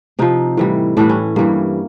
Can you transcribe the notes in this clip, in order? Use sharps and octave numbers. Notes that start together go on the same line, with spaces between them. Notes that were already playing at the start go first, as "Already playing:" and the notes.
C3 F3 D#4
A2 E3 G3
A2 E3 G3 D4
C#4
G2 E3 G3 A#3